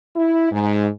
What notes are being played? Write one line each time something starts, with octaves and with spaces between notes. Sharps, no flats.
E4
G#2